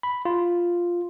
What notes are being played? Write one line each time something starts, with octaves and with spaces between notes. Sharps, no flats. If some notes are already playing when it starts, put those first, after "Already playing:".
B5
F4